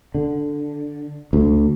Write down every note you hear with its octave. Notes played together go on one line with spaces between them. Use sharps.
D3
D2